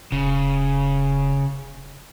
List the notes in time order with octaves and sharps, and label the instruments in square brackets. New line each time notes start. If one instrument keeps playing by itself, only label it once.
[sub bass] E1 [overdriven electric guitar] C#3